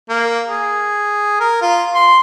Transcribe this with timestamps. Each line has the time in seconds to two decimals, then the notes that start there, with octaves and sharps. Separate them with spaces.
0.09 A#3
0.48 G#4
1.40 A#4
1.62 F4
1.95 C6